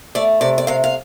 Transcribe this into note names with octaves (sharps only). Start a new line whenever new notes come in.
A3 D5
C3 D5
D5
C3 F5
F5